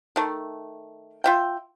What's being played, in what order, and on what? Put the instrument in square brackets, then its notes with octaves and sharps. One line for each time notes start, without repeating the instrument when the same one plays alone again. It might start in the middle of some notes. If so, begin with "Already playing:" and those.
[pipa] D#3 A3
F4 E5 G5